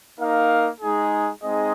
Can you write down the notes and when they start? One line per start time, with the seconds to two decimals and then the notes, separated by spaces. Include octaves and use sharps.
0.18 A#3 D#4 A#4 F5
0.81 G#3 D#4 G#4
1.43 G#3 C4 D#4 G#4 D#5